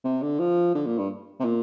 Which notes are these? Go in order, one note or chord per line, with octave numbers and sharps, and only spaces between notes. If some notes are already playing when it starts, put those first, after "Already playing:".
C3
D3
F3
D3
A#2
G2
C3
A#2